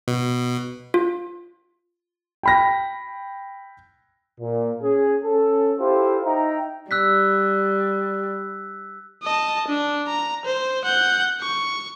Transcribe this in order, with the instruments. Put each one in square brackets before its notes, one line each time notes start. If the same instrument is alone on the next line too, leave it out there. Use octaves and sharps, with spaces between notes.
[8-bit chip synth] B2
[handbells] F4
[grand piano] G5 B5 A#6
[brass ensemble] A#2
C#4 G#4
C#4 A4
E4 F4 G4 A4 C5
D#4 E5 G5 A#5
[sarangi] G3 [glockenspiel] E6 F#6 B6
[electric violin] D#5 A5
D4
A#5
C5
F#5 G6
C#6